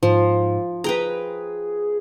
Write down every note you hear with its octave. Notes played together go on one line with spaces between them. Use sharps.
G#2 F3
G#4 B4 G5 A#5